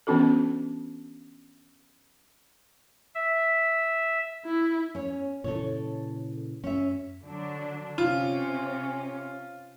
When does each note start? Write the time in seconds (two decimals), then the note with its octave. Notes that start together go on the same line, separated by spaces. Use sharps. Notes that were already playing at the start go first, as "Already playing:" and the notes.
0.07 E3 B3 C#4 D4 F#4 A4
3.15 E5
4.45 E4
4.95 C#4 C#5
5.44 A#2 C#3 E3 A4 C#5
6.64 F#2 C#4 E5
7.23 D3 F#3 D4
7.98 C3 C#4 F4